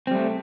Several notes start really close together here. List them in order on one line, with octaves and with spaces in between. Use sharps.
C4 G3 A3